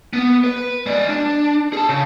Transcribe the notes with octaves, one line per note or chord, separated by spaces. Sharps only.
B3
B4
G#3 D5
D4
G#4 A5
C#3